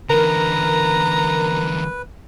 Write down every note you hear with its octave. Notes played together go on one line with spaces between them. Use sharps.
E2 D3 A#4 B4 A#5